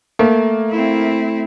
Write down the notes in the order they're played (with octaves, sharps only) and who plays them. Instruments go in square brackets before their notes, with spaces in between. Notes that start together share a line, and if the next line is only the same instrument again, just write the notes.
[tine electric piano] A3 [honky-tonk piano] A#3
[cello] C4 E4